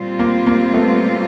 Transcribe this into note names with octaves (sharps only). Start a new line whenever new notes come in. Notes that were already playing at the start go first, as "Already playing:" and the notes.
Already playing: A#2 G3 C4 F4
A#3
A#3
A3 B3